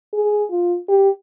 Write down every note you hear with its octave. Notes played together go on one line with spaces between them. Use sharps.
G#4
F4
G4